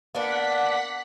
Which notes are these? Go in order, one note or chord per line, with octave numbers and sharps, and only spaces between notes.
A#3 B3 D4 F#5 B6